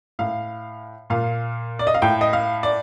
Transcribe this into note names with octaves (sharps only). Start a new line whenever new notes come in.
A2 F5
A#2 F5
D5
D#5
F5
A2 G5
D#5
F5
D5